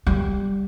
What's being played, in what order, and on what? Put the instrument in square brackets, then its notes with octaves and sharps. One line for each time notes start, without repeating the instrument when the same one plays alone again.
[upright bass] G3